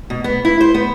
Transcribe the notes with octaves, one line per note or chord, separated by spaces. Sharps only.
B2
B3
E4
C5
B3